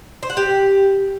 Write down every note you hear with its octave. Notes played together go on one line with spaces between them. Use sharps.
C5
F#5
G4